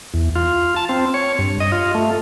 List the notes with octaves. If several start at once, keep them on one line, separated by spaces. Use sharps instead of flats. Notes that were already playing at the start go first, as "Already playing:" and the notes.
E2
F4
A5
C4
C#5
G2
D#5
F4
A3